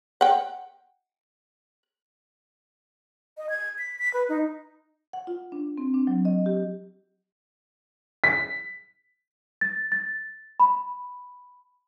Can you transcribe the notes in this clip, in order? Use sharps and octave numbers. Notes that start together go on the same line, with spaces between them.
F#5 G5
D#5
G#6
B6
B6
B4
D#4
F#5
F4
D4
C4
D4
F#3
D#5
G4
B6
A6
A6
B5